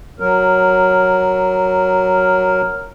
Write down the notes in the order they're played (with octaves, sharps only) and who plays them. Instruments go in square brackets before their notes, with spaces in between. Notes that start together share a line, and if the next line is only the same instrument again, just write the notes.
[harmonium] F#3 A#4